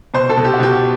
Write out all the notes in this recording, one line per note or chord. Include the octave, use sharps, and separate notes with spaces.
B2 C5
A4
B2
G4
F#4
B2 G4